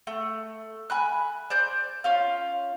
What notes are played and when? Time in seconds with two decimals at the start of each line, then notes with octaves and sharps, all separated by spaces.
0.07 A3
0.90 G#5 B5 F#6
1.50 C5 D5 G6
2.04 C#4 F4 F5